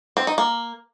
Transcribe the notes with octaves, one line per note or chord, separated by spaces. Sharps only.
C4
D#4
A#3